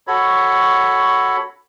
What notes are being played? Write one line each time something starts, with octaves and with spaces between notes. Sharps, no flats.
F#4 A4 C#5 B5